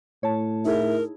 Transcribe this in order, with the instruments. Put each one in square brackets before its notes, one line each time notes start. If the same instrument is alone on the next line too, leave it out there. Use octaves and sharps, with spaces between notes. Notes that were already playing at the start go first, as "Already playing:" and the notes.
[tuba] A2 [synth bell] C#5 A5
[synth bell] D#4 E4 G#4 [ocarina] A#4 [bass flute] E5